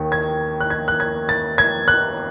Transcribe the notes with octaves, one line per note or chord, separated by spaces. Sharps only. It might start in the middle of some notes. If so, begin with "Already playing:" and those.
Already playing: D#2 D#3
G#6
F#6
G#6
F#6
G#6
A6
G#6
F#6